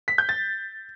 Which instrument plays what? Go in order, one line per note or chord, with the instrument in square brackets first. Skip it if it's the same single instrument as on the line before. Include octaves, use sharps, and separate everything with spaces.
[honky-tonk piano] B6
G6
A6